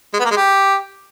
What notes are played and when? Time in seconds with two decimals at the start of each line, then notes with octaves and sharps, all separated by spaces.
0.14 G#3
0.19 B3
0.25 A#3
0.31 G#3
0.37 G4